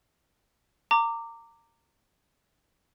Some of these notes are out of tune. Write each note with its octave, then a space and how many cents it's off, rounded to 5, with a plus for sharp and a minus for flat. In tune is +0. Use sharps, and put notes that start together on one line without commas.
A#5 -25 D6 +0